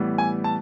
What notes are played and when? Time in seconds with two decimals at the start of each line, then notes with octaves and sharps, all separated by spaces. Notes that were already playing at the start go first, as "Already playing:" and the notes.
Already playing: A2 E3 G3 B3
0.18 G#5
0.44 A5